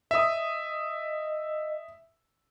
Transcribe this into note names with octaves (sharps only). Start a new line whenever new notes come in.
D#5 E5 D#6